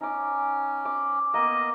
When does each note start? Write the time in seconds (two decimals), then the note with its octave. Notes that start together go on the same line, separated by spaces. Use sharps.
0.01 C#4 D#4 D6
0.85 D6
1.34 A#3 B3 D#5